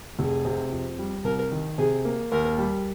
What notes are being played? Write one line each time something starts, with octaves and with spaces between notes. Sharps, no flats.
F1 G#4
C3
F2
G3
C2 A#4
D#3
C3 G#4
A#3
D#2 A#4
G3